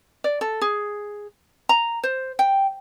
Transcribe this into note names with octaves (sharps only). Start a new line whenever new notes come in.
D5
A4
G#4
A#5
C5
G5